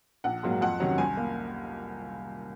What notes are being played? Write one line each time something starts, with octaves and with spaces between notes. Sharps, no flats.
A#1 F#5
G#2 F#3 A#3
F2 F#5
C3 D#3 F#3 C#4
C2 G#5
A#3